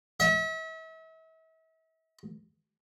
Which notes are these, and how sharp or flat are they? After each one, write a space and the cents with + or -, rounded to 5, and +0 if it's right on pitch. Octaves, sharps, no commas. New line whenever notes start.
E5 -40